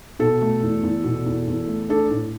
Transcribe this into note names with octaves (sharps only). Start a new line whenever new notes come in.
B2 A4
A3
E2
E2
B2
E2
E2
A3
D4 A4
A2